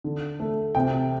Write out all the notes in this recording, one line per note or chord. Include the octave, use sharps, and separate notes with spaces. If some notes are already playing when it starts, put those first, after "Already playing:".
D3
A3
C3 G5